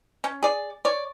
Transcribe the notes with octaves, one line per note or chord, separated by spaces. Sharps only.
C#4
G#4 D5
C#5 D5